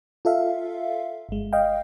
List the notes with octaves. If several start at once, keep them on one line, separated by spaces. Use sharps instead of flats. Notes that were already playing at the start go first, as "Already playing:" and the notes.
F4 A4 E5 F5
G1 G#3
D#5 F5 G5